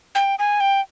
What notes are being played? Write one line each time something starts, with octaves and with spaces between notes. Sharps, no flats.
G5
G#5
G5